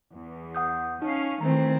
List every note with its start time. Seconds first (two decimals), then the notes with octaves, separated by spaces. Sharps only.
0.15 E2
0.55 F#5 D#6 G6
1.02 C#4 D#4 F5
1.41 D#3 E3 A3 C4 A#5